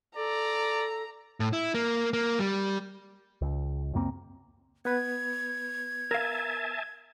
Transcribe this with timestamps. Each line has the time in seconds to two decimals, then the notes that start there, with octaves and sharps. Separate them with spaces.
0.17 A4 D5 A#5
1.40 A2
1.53 E4
1.74 A#3
2.13 A#3
2.40 G3
3.41 C#2
3.94 C#2 F#2 A#3 C4
4.85 B3 B4 G#6
6.11 A#4 E5 F5 G#5 A5